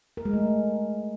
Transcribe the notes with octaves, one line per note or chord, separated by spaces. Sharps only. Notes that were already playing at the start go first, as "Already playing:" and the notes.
A#4
G#3
A3